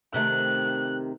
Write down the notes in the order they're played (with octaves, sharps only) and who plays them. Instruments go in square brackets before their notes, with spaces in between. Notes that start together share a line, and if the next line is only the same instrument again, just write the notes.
[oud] C3 D#3 A3 [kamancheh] F#6